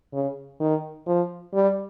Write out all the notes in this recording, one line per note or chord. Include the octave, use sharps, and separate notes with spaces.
C#3
D#3
F3
G3